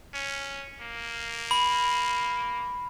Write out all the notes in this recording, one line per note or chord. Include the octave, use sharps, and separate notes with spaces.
C#4
A#3
B5